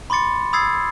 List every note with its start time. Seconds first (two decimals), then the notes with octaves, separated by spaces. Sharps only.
0.10 B5 C6 D6 A6 C#7
0.53 B5 D#6 E6 G#6 A6 C7